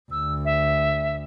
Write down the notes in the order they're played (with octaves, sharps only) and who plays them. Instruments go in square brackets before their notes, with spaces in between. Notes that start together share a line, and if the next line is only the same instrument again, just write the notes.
[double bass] D2 [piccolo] E6
[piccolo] E5